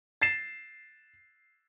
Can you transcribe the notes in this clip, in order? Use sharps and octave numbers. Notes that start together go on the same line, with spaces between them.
A6 C7 E7